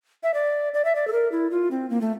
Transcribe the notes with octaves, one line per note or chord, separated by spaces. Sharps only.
E5
D5
D5
E5
D5
A4
A#4
E4
F4
C4
A#3
A3